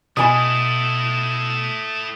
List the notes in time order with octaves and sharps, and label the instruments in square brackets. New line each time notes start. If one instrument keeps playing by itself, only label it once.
[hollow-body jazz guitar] B2 G#5 B5 [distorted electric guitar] A3 E4 [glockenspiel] D#6